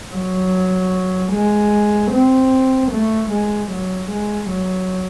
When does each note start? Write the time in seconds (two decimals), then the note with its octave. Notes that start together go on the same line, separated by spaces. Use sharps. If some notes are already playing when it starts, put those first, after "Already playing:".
0.14 F#3
1.33 G#3
2.12 C4
2.92 A3
3.32 G#3
3.72 F#3
4.11 G#3
4.50 F#3